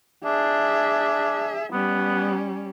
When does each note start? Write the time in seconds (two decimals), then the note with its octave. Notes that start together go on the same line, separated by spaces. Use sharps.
0.24 D4 G#4 E5
1.72 G3 B3 C#4